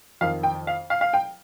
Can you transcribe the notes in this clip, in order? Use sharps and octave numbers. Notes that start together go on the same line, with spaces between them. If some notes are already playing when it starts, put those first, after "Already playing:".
F2 D#3 F5
G5
F5
F5
F5
G5